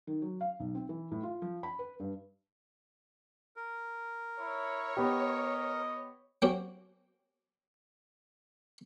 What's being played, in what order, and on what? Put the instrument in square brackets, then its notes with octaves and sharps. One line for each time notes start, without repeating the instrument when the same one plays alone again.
[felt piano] D#3
F#3
F5
B1
C4
E3
A2
F4
F3
B5
B4
G2
[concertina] A#4
[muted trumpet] E4 [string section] C#5
[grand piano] B3 G4 [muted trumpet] D#5
[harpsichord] F#3 A#3 C4 C#4 F#4 G4